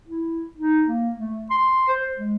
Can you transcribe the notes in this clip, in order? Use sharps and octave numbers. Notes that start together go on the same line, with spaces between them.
E4
D#4
A#3
A3
C6
C5
G#3